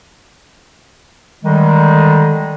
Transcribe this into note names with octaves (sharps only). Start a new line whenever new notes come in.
D3 D#3 G3 G#3